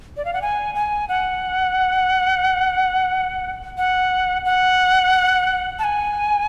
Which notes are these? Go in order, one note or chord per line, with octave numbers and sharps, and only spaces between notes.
D5
F5
F#5
G#5
G#5
F#5
F#5
F#5
A5
G#5